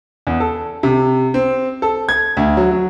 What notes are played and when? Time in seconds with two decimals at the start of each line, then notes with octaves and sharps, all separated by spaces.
0.27 E2
0.40 A4
0.83 C3
1.34 C4
1.82 A4
2.09 G#6
2.37 D2
2.57 F#3
2.71 F#3